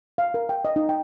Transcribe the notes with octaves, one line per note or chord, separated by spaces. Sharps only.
F5
A#4
G5
D#5
D#4
G5